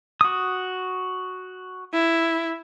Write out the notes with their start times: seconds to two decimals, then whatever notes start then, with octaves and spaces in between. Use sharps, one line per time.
0.21 F#4 D#6
1.93 E4